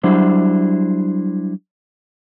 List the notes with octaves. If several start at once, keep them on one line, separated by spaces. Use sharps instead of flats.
F#3 G3 D4 E4 C5